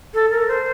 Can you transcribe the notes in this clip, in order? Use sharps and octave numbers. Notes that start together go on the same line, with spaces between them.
A4
A#4
C5